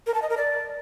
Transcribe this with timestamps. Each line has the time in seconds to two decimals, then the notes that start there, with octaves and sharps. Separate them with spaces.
0.07 A#4
0.14 A5
0.22 D#5
0.30 A#4
0.37 D5